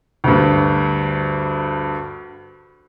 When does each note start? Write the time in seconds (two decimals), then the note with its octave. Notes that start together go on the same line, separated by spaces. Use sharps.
0.24 D2 G2